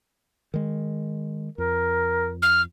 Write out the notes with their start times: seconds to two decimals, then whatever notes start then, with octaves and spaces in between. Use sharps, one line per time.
0.54 D#3 G#3
1.58 F2 A#4
2.42 F6